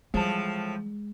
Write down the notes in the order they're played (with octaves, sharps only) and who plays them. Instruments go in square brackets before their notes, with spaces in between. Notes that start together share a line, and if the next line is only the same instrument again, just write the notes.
[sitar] A2 F3 [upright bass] E3 G3 [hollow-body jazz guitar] G#3 A5